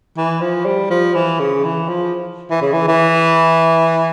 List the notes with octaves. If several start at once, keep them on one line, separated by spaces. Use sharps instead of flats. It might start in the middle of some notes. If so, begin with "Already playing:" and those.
E3
F3
G3
F3
E3
C#3
E3
F3
E3
C#3
E3
E3